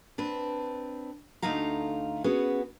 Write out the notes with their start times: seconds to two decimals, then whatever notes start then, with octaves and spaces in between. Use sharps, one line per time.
0.18 C4 D4 B4
1.42 D2 A3 D#4 F4 F5 A#5
2.24 B3 C#4 F#4 G#4 B4